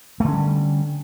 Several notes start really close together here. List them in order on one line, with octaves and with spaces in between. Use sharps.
A3 D3 C#4 G3